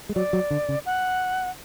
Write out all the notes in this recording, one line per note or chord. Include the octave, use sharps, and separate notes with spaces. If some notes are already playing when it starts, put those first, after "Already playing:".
G#3
F#3 D5
F#3
D3
C#3
F#5